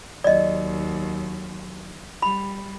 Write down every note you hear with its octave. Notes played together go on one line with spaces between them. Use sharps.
D#2 F#3 D5 D#5
G3 B5